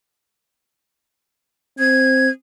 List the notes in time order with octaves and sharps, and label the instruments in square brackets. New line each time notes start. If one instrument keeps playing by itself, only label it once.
[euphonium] C4 [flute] G#6